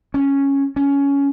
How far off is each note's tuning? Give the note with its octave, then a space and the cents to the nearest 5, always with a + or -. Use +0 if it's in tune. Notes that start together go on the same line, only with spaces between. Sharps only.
C#4 -5
C#4 +15